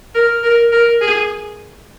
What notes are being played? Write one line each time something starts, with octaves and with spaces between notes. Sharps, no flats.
A#4
A#4
A#4
G#4